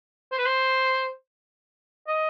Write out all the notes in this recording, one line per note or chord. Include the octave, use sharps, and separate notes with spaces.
C5
B4
C5
D#5